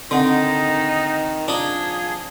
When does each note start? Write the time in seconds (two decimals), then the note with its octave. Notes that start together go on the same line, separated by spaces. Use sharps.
0.11 D3 D#3 C4 D#4 F#5
1.48 F3 D4 D#4 G#4